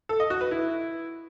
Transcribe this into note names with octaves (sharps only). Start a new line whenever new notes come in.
A4
D#5
F#4
B4
E4